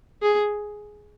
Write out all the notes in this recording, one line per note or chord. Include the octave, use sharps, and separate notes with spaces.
G#4